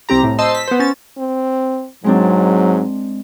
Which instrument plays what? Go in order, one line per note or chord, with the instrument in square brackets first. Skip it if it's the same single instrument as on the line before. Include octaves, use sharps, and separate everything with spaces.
[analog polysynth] C2 C4 G4 A#5
A2
C5 D#5 A5 C6 E6
B6
B3 C5
C#4 A6
[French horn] C4
[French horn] G#2 [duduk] F#3 [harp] G#3 C4 D4